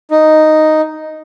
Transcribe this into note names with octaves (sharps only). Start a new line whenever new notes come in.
D#4